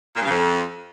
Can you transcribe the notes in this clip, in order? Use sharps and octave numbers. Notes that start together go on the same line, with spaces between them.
A#2
G2
C#3
F2